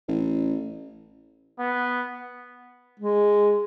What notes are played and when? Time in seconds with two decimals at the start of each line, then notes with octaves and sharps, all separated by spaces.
0.08 A1
1.59 B3
3.00 G#3